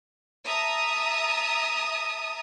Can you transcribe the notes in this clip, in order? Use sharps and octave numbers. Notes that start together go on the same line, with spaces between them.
E5 A5 A#5 D#6